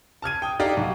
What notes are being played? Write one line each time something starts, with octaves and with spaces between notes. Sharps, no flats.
A5 F6 G#6 D#7
G5 D#6
D#4 G4 A4 D5 F5 A#5
B1